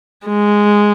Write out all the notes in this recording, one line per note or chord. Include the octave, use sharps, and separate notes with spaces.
G#3